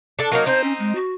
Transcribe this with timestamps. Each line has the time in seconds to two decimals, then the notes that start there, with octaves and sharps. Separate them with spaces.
0.19 D4 A4
0.32 F#3 A#3 D#4 A#4
0.46 C4 D#4 C5
0.64 C#4
0.79 G#3
0.95 F#4